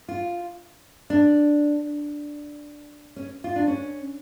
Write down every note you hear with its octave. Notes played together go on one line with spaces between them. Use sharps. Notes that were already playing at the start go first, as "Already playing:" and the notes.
F4
D4
C#4
F4
D4
C#4